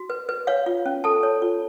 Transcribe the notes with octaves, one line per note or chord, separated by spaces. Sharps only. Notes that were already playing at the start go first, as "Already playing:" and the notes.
Already playing: F#4
B4
B4
C#5 F5
F4
C#4
A4 A5
C#5
F4